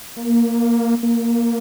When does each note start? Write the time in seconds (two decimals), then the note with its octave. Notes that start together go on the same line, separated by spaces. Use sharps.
0.16 A#3
1.03 A#3